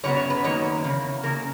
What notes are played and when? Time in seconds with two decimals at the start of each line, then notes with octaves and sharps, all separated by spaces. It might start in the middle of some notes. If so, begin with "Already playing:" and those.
0.03 F#2 C#3 F#3 B3 C#5
0.17 C#5
0.30 B4
0.44 F#2 D#3 A#3 C#5
0.84 E2 C#3 A#3
1.23 C#3 F#3 A#3 A#4